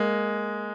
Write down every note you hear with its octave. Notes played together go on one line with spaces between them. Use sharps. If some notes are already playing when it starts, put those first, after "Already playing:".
Already playing: G#3 A#3